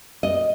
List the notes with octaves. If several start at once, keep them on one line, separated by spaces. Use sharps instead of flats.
D#5